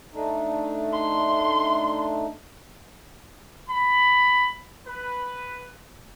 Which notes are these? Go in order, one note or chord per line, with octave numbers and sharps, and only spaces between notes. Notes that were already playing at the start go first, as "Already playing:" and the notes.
A3 D4 D#4
C6
B5
B4